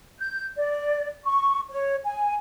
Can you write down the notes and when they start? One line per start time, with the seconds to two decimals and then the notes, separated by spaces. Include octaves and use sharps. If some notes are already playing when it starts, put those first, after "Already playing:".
0.19 G6
0.57 D5
1.24 C#6
1.70 C#5
2.04 G#5